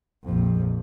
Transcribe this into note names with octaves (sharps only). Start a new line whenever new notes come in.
A#1 F2